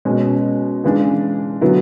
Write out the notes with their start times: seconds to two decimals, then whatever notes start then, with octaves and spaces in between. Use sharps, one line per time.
0.05 B2 G#3 C#4
0.84 C#3 E3 G#3 D4
1.61 D3 F#3 B3 E4